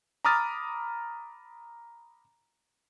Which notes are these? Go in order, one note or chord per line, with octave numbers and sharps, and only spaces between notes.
A#5 B5 D6 D#6 F6 A6